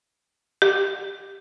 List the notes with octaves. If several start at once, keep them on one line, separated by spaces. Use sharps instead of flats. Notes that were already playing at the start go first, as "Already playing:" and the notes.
G4